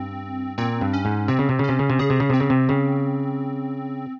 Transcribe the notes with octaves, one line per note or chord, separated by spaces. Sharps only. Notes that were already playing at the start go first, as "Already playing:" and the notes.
Already playing: G2 C4
A#2 C4
G2
C#4
G#2
C3 C4
C#3
C3
C#3 C#4
C3
C#3
C3
C#3 G#4
C3
C#3
C3 C4
C#3
C3
C#3